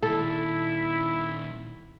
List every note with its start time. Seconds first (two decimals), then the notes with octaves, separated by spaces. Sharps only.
0.02 A#2 D#3 E4 A4